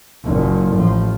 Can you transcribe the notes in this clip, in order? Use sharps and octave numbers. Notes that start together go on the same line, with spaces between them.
F#1 A#2
A1 F3